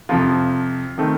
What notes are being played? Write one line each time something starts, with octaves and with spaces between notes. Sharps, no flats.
F2 C3 F3 F4
D#3 A3 C4